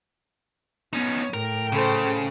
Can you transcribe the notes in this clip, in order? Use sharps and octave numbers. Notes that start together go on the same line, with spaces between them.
B3 C#4 D#4
A2 A#4 G5
C#3 A4 C5